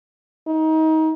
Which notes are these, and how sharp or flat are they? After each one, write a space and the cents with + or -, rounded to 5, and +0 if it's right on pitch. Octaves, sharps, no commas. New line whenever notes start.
D#4 +25